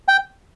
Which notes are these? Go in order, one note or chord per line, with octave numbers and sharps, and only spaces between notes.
G5